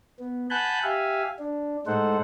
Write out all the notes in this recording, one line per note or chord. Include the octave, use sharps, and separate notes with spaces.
B3
F#5 G#5 A5 B5 F#6 G6
G4 E5 F5 G#5
D4
A2 G#3 D#4 A4 C5 F#5